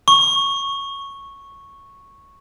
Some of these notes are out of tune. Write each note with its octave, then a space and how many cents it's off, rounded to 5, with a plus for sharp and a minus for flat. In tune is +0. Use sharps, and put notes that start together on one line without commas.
C#6 -5